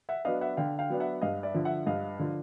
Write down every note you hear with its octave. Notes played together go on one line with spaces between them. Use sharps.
E5 F#5
F#3 B3 D4 D#5 F5
E5 F#5
D3 F5 G5
F5 G5
F#3 B3 D4
E5 F#5
G2 D#5 F5
D5 E5
D3 F3
E5 F#5
G2 D#5 F5
D3 F3